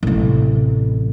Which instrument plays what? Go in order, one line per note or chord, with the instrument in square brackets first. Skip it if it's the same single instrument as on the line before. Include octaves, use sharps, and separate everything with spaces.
[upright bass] A1 C3